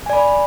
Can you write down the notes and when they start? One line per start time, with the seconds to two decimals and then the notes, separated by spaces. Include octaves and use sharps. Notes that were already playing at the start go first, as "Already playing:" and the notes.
0.06 G#5
0.10 D5
0.13 B5